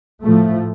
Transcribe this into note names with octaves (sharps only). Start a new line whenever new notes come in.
A2 F3 A3